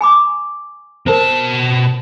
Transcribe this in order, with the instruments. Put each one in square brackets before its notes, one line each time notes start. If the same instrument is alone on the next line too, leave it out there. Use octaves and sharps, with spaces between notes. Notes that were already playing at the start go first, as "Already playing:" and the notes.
[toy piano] G#5 B5 D6
[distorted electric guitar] B2 A5 [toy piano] A#4 C5